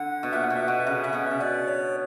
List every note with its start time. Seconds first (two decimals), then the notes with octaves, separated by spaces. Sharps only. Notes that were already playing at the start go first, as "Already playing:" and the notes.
Already playing: D3 F#5
0.23 B2
0.32 A#2 E5
0.44 F#5
0.50 B2
0.56 E5
0.68 B2 F#5
0.80 E5
0.87 C#3 F#5
1.03 C#3 E5
1.13 B2 F#5
1.27 C#3 E5
1.40 B2 D5
1.68 C#5